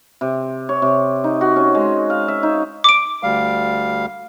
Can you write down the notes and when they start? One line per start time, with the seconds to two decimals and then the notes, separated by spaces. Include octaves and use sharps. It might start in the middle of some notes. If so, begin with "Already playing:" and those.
0.21 C3
0.69 C#5
0.82 C3
1.24 D#4
1.41 F#4
1.56 C#4
1.75 G#3
2.10 F5
2.28 E5
2.43 D#4
2.84 D6 D7
3.23 D2 G3 F5